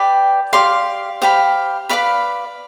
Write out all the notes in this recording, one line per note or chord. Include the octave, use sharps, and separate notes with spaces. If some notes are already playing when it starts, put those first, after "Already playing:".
Already playing: G4 B4 D5 G5
G4 D5 F5 C6
G4 C5 F5 B5
B4 D5 F5 B5